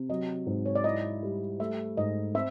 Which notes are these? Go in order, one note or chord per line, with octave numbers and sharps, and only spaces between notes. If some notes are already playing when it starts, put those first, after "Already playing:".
Already playing: C3
F#3 D#5
G#2
C#5
D5
E4 D#5
G3
A3 E5
G#2 D#5
C4 E5